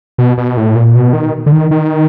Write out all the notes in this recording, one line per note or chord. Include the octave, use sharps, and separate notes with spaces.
B2
B2
A2
A#2
B2
D#3
D3
D#3
D#3